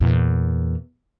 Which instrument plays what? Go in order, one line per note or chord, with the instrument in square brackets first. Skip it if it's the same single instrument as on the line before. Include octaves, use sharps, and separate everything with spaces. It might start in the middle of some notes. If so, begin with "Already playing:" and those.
[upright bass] E2 A#2